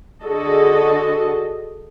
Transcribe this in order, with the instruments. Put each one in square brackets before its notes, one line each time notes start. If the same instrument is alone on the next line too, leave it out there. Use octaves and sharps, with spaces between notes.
[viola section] D3 F#4 G#4 A4 D#5